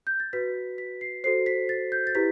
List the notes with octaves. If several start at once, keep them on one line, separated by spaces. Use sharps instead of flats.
G6
A6
F#4 B4 B6
B6
C7
F#4 A4 C5 C7
B6
A6
G6
A6
E4 G4 B4 B6